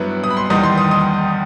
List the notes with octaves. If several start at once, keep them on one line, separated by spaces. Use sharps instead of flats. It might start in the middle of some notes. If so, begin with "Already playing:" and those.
Already playing: G2 F#3 B3 E4 F#5
D#6
B5
C6
E2 D#3 G3 D#4 D#6
C6
D#6
D#6